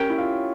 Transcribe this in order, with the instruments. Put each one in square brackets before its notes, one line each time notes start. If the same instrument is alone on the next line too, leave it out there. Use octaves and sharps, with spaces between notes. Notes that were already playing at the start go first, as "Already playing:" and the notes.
Already playing: [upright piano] C#4 [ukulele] G4 A#4 C#5 G5
[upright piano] E4
F4